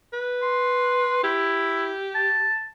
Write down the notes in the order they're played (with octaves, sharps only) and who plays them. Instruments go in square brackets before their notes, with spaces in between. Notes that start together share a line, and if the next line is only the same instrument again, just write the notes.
[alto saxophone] B4
[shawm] C6
[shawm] E4 [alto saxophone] G4
[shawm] A5